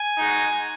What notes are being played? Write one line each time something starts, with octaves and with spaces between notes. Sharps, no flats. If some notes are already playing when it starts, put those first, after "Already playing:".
Already playing: G#5
G#3 D#4 F#4